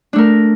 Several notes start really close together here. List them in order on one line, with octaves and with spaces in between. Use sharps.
D4 A3 A#4